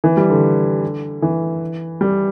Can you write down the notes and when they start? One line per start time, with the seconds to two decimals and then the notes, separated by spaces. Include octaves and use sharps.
0.04 E3
0.17 G3
0.30 D3
1.22 E3
2.01 G3